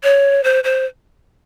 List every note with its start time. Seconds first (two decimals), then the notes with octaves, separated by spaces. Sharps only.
0.03 C#5
0.44 C5
0.64 C5